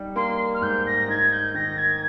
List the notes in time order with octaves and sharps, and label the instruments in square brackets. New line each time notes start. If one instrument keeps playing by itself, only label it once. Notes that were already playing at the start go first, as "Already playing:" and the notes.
Already playing: [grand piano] G3 D#4
[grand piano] A#3 [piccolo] C6
[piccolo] F6
[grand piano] G#2 [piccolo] G6
[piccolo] A#6
[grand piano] D#4 [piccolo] G#6
[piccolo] G6
[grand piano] D#3 [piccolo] A#6
[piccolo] G#6